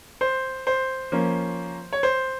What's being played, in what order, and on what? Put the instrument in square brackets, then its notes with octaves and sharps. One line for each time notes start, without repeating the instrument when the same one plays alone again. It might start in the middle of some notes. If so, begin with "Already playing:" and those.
[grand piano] C5
C5
F3 A#3 C#4
C#5
C5